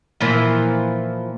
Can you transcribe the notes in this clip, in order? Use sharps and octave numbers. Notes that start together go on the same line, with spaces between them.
A#2 E3 F3